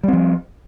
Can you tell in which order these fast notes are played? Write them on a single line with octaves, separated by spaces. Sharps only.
G3 C4 F3